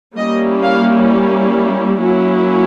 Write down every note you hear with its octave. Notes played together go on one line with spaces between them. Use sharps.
G3 A#3 C#4 E4 D#5
F5
F#3 A#3 C#4 E4